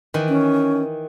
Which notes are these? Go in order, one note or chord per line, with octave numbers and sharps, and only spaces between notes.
D#3 E3
C#4